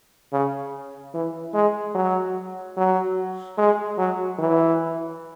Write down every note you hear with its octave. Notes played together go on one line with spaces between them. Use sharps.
C#3
E3
G#3
F#3
F#3
G#3
F#3
E3